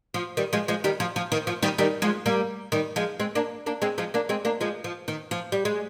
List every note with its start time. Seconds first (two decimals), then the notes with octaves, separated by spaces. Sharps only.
0.14 F3
0.37 D#3 G3
0.53 F3 G#3
0.68 F3 G#3
0.84 D#3 G3
1.00 F3
1.16 F3
1.32 D#3
1.47 F3
1.63 D#3 G3
1.78 D#3 G3
2.02 F3 G#3
2.26 G3 A#3
2.72 D#3 G3
2.96 F3 G#3
3.20 G#3 C4
3.35 A#3 D4
3.66 A#3 D4
3.82 G#3 C4
3.98 F3 G#3
4.14 A#3 D4
4.29 G#3 C4
4.45 A#3 D4
4.61 F3 G#3
4.84 F3
5.08 D#3
5.31 F3
5.52 G3
5.65 G#3